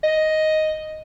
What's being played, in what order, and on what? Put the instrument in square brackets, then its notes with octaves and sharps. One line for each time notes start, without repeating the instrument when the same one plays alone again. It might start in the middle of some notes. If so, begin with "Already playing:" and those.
[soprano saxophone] D#5